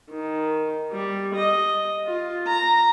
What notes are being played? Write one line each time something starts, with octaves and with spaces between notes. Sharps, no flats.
D#3
G3
D#5
F4
A#5